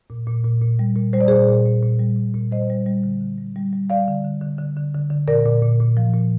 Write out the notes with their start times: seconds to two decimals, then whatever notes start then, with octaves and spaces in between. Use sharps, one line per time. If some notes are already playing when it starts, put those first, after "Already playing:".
0.10 A#2
0.27 A#2
0.45 A#2
0.62 A#2
0.79 G3
0.96 A#2
1.13 G3 C5
1.21 D5
1.28 A#2 G#4 C5
1.48 A#2
1.66 A#2
1.83 A#2
2.00 G3
2.17 A#2
2.34 A#2
2.52 G3 C5 D#5
2.70 G3
2.86 G3
3.04 D3
3.20 D3
3.38 G3
3.56 G3
3.73 G3
3.90 G3 D5 F5
4.08 D3
4.24 D3
4.41 D3
4.59 D3
4.77 D3
4.94 D3
5.10 D3
5.28 A#2 A#4 D5
5.46 A#2
5.62 A#2
5.81 A#2
5.97 F3
6.14 A#2